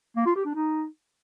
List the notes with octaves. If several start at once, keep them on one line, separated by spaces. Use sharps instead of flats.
A#3
F4
G4
D4
D#4